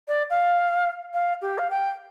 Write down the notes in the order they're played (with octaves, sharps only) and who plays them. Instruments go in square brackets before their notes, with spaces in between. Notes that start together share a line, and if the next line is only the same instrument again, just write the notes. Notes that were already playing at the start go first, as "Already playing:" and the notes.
[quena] D5
F5
F5
G4
F5
G5